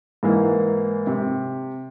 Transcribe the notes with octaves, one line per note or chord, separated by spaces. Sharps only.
G#2 E3 A#3
C3